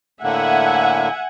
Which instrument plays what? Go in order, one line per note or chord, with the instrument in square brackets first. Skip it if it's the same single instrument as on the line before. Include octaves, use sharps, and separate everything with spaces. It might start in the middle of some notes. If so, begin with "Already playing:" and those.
[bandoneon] A2 D3 A#3 [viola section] E5 F#5 G#5